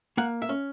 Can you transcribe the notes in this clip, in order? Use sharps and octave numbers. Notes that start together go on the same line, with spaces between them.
A#3 F#5
E5
C#4